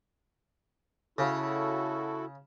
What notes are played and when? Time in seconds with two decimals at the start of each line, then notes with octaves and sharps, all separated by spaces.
1.18 C#3 E4 F#4 A4